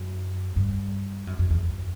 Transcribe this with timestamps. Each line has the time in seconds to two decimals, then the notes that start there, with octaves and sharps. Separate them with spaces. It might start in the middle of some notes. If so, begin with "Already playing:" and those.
Already playing: F#2
0.56 G2
1.27 F#2
1.39 F#2
1.50 E2
1.63 F#2